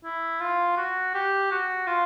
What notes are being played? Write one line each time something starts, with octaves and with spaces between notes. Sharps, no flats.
E4
F4
F#4
G4
F#4
F4